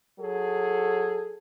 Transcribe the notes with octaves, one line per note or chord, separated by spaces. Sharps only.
F#3 G#4 A4